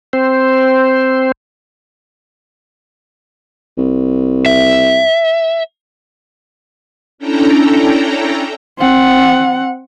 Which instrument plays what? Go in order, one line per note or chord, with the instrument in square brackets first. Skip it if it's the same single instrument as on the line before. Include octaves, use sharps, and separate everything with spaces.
[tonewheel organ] C4 C5
[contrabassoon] C2
[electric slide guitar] E5
[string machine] C#4 D4 E4 A4 G5 A#5
[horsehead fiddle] C4 F#5